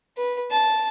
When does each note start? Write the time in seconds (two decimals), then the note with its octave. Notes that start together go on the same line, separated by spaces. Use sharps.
0.17 B4
0.51 A5